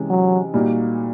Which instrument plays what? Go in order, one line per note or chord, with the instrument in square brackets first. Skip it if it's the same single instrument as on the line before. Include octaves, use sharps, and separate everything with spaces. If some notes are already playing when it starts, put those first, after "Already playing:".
Already playing: [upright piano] C3 E3 G#3 C#4
[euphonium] F#3
[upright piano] A#2 G3 A#3 D#4 F#4